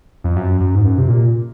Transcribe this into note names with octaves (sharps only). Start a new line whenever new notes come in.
F2
F#2
F#2
G#2
F#2
C3
A#2